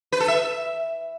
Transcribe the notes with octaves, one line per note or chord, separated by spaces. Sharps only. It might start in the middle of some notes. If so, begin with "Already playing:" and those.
B4
A4
E5